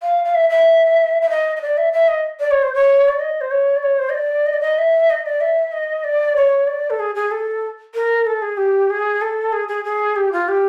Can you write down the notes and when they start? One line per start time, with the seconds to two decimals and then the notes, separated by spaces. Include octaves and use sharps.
0.02 F5
0.24 F5
0.34 E5
0.49 E5
1.21 E5
1.29 D#5
1.56 D#5
1.61 D5
1.77 E5
1.92 E5
2.08 D#5
2.40 D5
2.51 C#5
2.62 C5
2.73 C#5
3.08 D5
3.19 D#5
3.40 C5
3.50 C#5
3.75 D5
3.82 C#5
3.98 C5
4.09 D#5
4.14 D5
4.46 D#5
4.53 D5
4.60 D#5
4.78 E5
5.09 D#5
5.25 D5
5.40 E5
5.72 D#5
6.04 D5
6.35 C#5
6.67 D5
6.90 A4
6.99 G#4
7.15 G#4
7.31 A4
7.94 A#4
8.26 A4
8.42 G#4
8.57 G4
8.89 G#4
9.21 A4
9.52 G#4
9.68 G#4
9.84 G#4
10.16 G4
10.32 F4
10.48 G4